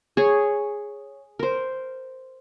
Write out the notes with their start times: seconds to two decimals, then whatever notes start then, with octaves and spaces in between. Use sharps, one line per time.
0.17 G#4 C#5
1.39 A#4 C5